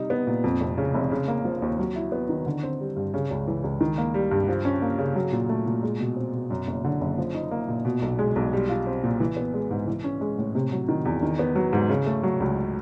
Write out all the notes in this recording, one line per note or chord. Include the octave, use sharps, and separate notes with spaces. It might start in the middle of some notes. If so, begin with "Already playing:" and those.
Already playing: C3 G3 D#4
B3
A#2
F2
F1
C#3
F1
C#3
A#3
F3
D#2
F#3
E4
B3
D#3
D3
C4
G3
G2
C#3
C#2
E3
C#2
D#3
A#3
G3
G2
F3
C#4
A#3
C#3
F#3
A#2
A3
A#2
G#3
B2
C4
B2
F#2
F#1
D3
F#1
F3
D#4
A#3
A#2
B2
B1
G#3
B1
G3
F4
C4
A#2
E3
B3
G#3
G#2
E3
C#4
G#3
A2
C3
F#3
D#3
E2
D#3
B3
F#3
G#2
C#3
A3
F#3
C#2